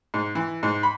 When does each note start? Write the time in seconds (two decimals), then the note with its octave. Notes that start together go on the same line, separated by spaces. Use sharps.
0.14 G#2
0.35 E3
0.63 G#2
0.83 B5